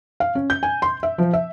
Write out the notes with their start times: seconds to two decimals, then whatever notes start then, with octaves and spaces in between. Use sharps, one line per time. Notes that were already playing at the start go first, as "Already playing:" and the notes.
0.20 F5
0.35 C#4
0.50 G6
0.63 G#5
0.82 C6
1.03 E5
1.18 F3
1.33 E5